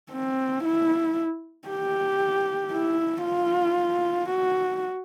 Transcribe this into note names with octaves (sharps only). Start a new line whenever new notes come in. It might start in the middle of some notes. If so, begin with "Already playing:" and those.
C4
E4
G4
E4
F4
F#4